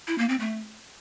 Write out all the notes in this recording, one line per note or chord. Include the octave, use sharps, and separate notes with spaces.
E4
A#3
C4
A3